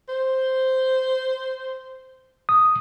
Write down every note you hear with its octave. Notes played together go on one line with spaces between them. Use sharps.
C5
D#6